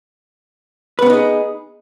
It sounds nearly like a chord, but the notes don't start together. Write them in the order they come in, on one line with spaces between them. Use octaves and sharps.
B4 B3 C#4 D#4 G#4